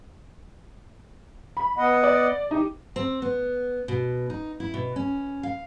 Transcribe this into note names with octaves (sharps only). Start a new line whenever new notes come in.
B5
B3 D#5 F#5
D5
D#4 G4
C4
B3
B2
D#4
E4
B2
C#4
F5